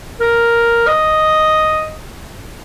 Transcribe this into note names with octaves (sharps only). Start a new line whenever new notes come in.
A#4
D#5